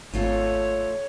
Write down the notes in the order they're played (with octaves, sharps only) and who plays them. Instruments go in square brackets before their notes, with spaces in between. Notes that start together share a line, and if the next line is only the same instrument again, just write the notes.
[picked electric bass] G#1 [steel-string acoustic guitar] A3 F4 A4 [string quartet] C#5